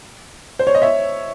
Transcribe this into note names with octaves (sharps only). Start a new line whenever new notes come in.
C5
C#5
D#5
C#5 E5